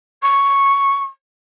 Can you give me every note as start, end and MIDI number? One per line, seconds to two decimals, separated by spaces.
0.22 0.98 85